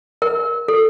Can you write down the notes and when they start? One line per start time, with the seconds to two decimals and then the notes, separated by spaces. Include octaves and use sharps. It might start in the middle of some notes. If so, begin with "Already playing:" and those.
0.22 A#4
0.68 A4